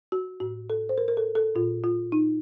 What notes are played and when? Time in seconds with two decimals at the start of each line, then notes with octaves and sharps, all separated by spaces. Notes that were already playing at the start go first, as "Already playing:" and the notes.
0.12 F#4
0.40 A2 F#4
0.70 A4
0.89 C5
0.98 A#4
1.08 A#4
1.17 A4
1.35 A4
1.55 A#2 F4
1.84 F4
2.12 D#4